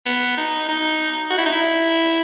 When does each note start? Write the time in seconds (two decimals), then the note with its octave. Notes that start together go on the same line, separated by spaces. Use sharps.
0.06 B3
0.37 D#4
0.69 D#4
1.31 F#4
1.38 E4
1.45 D#4
1.52 E4